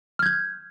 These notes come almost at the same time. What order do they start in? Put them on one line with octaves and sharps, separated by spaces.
F6 G#6 G6